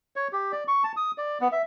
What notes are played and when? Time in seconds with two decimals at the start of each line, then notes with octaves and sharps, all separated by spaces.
0.16 C#5
0.33 G4
0.52 D5
0.68 C#6
0.84 A5
0.97 D#6
1.18 D5
1.41 B3
1.52 E5